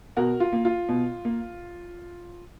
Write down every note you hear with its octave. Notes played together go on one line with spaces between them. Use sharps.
B2 F#4 A#4
F4
A#3
F4
B2
A#3